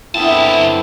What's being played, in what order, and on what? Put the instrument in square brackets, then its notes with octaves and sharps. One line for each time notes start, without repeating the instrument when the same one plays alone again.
[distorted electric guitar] F#2 A5 [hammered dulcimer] D3 B3 C4 [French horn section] E4